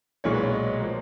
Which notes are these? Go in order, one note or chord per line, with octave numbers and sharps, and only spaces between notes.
B1 A#2 G#3 C#5
B4
C#5
D#5
F3 A#3